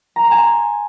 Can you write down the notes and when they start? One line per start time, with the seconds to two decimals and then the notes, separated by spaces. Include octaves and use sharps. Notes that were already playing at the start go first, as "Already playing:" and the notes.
0.16 A#5
0.24 C6
0.31 G#5